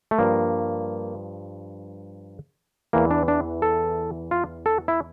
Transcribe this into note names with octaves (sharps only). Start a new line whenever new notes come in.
A3
G2 F3 A#3
E2 E3 A#3
D4
D4
A4
F4
A4
E4